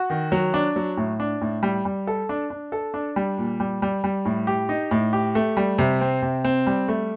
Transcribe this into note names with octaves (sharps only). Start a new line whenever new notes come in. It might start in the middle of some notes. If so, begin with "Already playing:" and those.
Already playing: F#4
D#3
F#3
D4
F#3
A2
D4
A2
G3
G3
A4
D4
D4
A4
D4
G3
A#2
G3
G3
G3
A2
G4
D#4
A2
G4
A3
G3
C3
C4
C3
C4
G3
A3